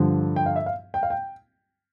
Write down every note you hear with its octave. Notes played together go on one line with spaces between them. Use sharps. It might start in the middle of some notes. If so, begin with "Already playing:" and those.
Already playing: G2 D3 F3
G5
F5
E5
F5
G5
F5
G5